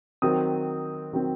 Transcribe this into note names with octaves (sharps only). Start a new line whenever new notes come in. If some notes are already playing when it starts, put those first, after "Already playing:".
D#3 F#3 C4 D#6
D#3 F#3 C4